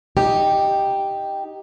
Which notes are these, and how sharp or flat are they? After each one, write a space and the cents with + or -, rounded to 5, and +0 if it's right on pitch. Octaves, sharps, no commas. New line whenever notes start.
D#4 +0 G4 +0